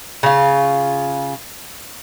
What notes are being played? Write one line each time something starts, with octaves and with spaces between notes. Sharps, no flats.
C#3 F4